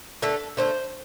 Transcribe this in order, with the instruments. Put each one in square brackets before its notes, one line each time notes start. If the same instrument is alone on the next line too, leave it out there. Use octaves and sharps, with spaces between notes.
[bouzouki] D3 A3 A4
D3 A3 C5